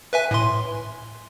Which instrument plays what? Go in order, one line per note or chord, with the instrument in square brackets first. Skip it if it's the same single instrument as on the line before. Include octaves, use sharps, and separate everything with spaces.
[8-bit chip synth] B4 E5 G#5
A2 C6